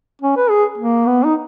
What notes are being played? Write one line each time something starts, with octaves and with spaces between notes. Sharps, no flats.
C#4
B4
G#4
A#3
B3
D#4